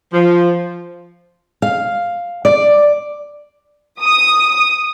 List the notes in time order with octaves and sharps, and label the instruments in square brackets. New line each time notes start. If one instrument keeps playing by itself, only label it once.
[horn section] F3
[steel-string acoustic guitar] F5
D5
[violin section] D#6